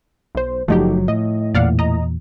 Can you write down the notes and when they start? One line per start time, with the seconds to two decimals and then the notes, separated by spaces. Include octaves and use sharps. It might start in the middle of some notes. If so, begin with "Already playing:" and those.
0.35 B1 C5
0.68 F#1 A#2 F3 F#3 A3 D#4 G4
1.08 A2 D#5
1.55 E2 A#2 D5 F5 F#5
1.79 D#5 A#5